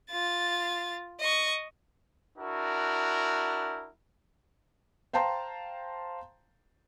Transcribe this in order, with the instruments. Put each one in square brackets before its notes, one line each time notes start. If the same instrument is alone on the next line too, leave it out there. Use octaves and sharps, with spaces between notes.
[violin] F4 A6
D#5 C#6
[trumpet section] D4 E4 F#4 A#4
[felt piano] C5 F5 G5 A5 A#5 C6